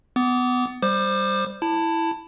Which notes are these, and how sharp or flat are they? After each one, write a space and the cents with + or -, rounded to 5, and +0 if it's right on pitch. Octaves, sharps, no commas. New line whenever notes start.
B3 +20 D6 -20
G3 +0 C5 +0 D6 +30
E4 +0 A5 +15